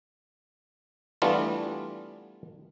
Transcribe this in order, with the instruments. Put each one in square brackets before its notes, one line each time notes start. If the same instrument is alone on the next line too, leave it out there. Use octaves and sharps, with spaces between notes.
[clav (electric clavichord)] E3 G3 A3 B3 D4 F4